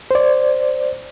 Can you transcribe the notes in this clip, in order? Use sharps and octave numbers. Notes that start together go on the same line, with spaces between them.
C5 D5